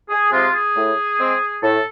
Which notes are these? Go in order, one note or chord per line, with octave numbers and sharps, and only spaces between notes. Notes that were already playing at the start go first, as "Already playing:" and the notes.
G#4
C3 F3 G#3 F4
G#4
A2
G#3 C4
A2 A4